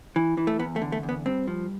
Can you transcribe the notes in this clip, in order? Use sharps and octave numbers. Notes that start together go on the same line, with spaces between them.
E3
E3
A3
E2 B3
A3
D3
A3
E2
B3
G2 C4
F3